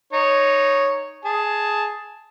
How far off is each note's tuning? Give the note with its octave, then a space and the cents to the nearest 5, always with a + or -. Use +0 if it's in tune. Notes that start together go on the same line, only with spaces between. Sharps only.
D#4 -10 C#5 +0
G#4 +10 A5 +0